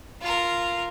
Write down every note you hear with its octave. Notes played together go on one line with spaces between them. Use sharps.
F4 A#4